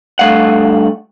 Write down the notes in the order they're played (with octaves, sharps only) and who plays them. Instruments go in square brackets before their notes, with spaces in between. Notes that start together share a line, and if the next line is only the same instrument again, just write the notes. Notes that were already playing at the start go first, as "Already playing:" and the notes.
[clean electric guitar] G2 A3 F5 F#5